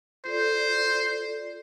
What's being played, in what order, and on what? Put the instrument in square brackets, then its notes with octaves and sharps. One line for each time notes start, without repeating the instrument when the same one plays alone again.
[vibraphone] F4 A4 D5 [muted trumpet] C5